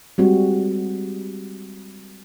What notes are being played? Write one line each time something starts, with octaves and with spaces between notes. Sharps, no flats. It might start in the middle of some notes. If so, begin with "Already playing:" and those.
G3 G#3 C4 F#4